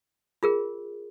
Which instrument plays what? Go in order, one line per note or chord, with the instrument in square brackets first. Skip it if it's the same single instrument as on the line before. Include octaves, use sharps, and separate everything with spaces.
[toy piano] F4 G#4 A#4